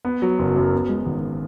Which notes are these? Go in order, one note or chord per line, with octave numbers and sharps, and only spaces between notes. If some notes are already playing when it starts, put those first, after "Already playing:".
B3
F#3
F#1
F#2
B3
G#3
G#1